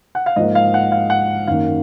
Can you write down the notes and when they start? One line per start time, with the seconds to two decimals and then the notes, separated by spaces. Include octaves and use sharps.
0.15 F#5
0.26 F5
0.36 G#2 F3 A#3 D#5
0.55 F5
0.74 F#5
0.92 F5
1.10 F#5
1.47 F#2 D#3 A#3 F5